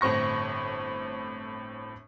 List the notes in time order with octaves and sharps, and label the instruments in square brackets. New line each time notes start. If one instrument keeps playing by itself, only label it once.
[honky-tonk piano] G1 A2 C4 C#6 A#6